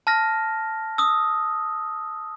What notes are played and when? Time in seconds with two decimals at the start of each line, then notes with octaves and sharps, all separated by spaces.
0.07 A5 F6 A#6
0.98 D#6 E6